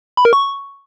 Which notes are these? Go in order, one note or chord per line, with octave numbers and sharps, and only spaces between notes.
B5
A#4
C#6